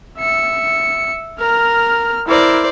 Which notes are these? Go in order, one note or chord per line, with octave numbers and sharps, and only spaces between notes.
E5 C#7
A#4 F6
E4 A#4 C5 D5